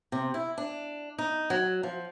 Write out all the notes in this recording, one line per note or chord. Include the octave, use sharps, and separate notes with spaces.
C3
E4
D4
D#4
F#3
F3